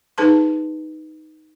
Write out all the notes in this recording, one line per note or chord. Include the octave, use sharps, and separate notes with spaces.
D#4 G#4 B4 A5 C6